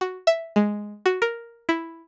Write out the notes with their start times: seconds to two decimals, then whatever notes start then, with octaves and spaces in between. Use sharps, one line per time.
0.01 F#4
0.27 E5
0.56 G#3
1.06 F#4
1.22 A#4
1.69 E4